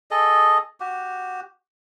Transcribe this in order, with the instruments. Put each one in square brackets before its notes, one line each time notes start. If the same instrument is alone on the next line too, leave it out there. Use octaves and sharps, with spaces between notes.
[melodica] G#4 A4 D#5
F#4 G4